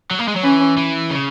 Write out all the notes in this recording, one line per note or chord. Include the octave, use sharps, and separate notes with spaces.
F#3
A#3
G#3
F#3
E3 C#4
E3
C#3